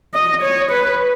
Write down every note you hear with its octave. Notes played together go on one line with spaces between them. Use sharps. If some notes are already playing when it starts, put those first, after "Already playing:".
D#5
C#5
B4